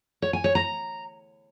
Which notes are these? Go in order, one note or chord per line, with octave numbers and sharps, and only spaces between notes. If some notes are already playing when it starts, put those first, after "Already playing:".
C#5
G#5
C#5
A#5